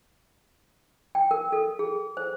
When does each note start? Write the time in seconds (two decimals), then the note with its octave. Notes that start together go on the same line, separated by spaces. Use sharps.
1.15 G5
1.31 A#4
1.52 A4
1.79 G#4
2.17 C5